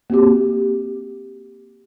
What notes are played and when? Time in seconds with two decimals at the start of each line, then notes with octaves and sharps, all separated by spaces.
0.10 A#3 C4 F#4 G4